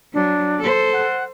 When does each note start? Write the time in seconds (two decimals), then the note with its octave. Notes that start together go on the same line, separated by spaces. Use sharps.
0.14 F#3 D4
0.59 A4 C5
0.93 F#5